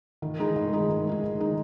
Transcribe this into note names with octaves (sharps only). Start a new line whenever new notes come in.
D#3
G#3 D#4 G#4
D#3
G#3 D#4 G#4
D#3
G#3 D#4 G#4
D#3
G#3 D#4 G#4